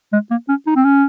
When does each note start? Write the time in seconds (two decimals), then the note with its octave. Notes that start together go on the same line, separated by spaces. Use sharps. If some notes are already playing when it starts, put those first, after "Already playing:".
0.13 G#3
0.31 A#3
0.49 C#4
0.67 D#4
0.76 C4
0.84 C#4